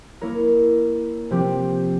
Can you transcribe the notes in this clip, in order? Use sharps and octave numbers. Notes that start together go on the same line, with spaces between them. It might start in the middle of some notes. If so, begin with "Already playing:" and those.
A#3 E4 A#4 C#5
C3 F3 C4 G4